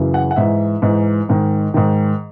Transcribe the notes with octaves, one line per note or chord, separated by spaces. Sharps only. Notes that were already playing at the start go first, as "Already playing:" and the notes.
Already playing: F#2 C#3 E3
F#5
F#5
G#2 E3 E5
G#2 E3
G#2 D#3
G#2 D#3